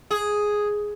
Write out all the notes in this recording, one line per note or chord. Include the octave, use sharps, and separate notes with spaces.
G#4